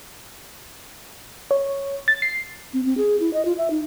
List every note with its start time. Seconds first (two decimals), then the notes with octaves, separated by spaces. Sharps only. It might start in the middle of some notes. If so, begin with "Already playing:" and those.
1.51 C#5
2.08 A6
2.22 C7
2.73 C4
2.85 C4
2.97 G#4
3.20 E4
3.33 D#5
3.45 F4
3.58 E5
3.70 D#4